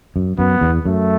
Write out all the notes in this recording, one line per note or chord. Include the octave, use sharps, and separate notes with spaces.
F#2
F#2 B3
E2
F#2 A3